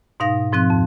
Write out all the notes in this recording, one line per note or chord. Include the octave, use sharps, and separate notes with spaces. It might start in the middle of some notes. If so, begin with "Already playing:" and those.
G#2 B2 D#4 F5 A#6
G#2 F3 C4 F#6
F2